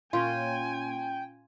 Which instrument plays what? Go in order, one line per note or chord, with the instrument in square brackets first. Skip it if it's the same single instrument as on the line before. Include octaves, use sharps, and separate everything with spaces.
[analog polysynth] A#2 C#4 [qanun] F4 [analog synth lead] G5 [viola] G#5